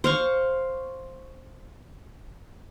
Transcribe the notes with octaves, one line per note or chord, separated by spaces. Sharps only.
C5 F5 C#6